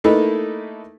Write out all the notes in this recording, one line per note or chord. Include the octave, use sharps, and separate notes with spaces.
A3 A#3 D#4 E4 A4 B4